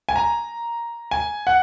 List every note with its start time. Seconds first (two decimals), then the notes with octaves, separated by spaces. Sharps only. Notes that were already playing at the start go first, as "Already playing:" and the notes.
0.09 G#5
0.16 A#5
1.11 G#5
1.47 F#5